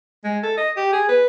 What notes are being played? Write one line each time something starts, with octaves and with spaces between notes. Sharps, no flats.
G#3
A4
D#5
G4
G#4
B4